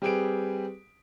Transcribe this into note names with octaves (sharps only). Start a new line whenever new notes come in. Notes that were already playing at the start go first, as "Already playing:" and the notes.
G3 C4 G4 G#4 B4 D7